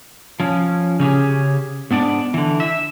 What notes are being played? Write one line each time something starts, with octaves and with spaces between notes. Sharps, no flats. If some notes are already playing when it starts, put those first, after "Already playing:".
F3 C#4
C#3 C#4 G4 G#4
G#2 B3 D4 D5
D3 E3
E5